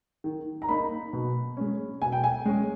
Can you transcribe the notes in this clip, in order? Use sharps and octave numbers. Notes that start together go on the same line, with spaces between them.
D#3
A#5
A#3 D#4 B5
B2
G#3 C#4
B2 G#5
G5
G#5
G#3 C#4